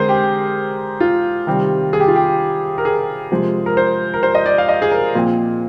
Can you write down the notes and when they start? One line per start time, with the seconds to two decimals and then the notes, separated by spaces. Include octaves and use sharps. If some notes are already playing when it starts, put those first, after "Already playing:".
Already playing: D3 G#3 C4 G#4 A#4 C5
0.09 G4
1.00 F4
1.47 C3 D#3 G3 C4
1.93 G#4
2.00 G4
2.08 F4
2.16 G4
2.78 A#4
2.85 G#4
3.31 C3 F3 G#3
3.66 A#4
3.77 C5
4.14 A#4
4.23 C5
4.35 D#5
4.46 D5
4.58 F5
4.69 D#5
4.82 G#4
4.91 A#4
5.15 A#2 F3 C4